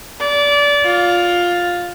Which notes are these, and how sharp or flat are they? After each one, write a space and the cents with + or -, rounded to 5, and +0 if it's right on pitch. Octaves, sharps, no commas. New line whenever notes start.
D5 -25
F4 +10